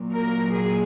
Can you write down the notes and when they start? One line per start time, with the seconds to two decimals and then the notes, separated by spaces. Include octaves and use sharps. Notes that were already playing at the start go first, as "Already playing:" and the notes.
Already playing: A#2 F#3
0.13 A#4
0.54 G#4